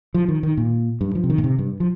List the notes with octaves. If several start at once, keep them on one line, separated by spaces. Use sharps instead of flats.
F3
D#3
D#3
A#2
G2
F3
C3
D#3
A#2
C3
G2
F3